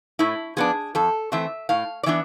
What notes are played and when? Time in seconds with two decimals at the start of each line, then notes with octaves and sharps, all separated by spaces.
0.19 A2 E4
0.57 F3 B3 D4 G#4
0.95 F2 A4
1.32 E3 A3 C4 E5
1.69 A2 F5
2.03 D5
2.06 E3 B3 D4 E5